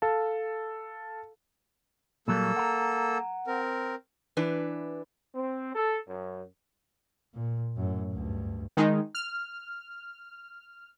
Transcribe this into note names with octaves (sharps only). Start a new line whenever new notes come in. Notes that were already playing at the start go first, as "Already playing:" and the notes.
A4 F5 A5
A#2 F#3 G3 A#3 A4 E6
F#5 A#5
C4 A#4
E3 D4 B4
C4
A4
F#2
A#2
F#2 A2
D2 G2
D#3 G#3 D#4
F6